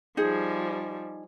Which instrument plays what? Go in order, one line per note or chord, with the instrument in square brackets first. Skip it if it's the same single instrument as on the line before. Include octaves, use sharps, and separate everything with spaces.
[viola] F3 G3 [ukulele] D#4 G#4